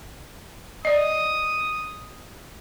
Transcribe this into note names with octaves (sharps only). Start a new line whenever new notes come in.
D5 D#5 D#6